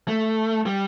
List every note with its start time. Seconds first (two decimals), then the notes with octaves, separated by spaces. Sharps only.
0.08 A3
0.66 G3